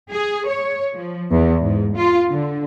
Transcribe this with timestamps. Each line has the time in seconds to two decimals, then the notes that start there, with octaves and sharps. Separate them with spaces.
0.12 G#4
0.47 C#5
0.94 F3
1.31 E2
1.62 G#2
1.96 F4
2.29 D3